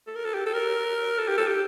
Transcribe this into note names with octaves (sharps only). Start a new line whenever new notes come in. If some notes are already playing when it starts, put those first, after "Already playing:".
A4
A#4
A4
G4
A4
A#4
A4
G4
A4
G4